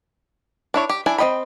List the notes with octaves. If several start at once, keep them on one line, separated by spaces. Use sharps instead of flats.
D4 E4 C#5
G4
D4 E4 D5 G#5
C4 G#4 D#5 G5 B5